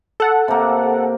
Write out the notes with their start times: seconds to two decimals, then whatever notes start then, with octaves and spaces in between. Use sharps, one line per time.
0.20 A4 F#5
0.48 C3 A#3